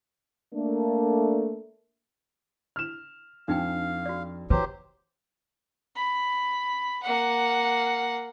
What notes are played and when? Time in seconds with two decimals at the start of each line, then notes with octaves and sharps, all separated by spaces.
0.54 A3 A#3 D4
2.76 F6 E7
3.48 F2 D4 D#4 F5 G5
4.06 F#4 D5
4.50 E3 F#3 G4 B4 C5
5.96 B5
7.02 A#3 F#5